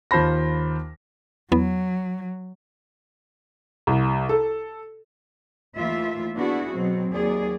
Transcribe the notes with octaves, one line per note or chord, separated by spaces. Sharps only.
D#2 F4 C5 A5 B5 A#6
E2 F#3 B3
C2
A4
D#2 E3 A3 F4 E5
B3 D4 E4 F#4 G#4
B2 F#3 C4
D#2 F#3 G#4 D5